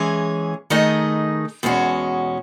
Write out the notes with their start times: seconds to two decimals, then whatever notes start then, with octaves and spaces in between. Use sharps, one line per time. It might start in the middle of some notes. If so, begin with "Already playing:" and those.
Already playing: E3 G#3 C#4 G#4
0.70 D#3 A3 D#4 G#4 D#5
1.63 E2 B2 G#3 C#4 F#4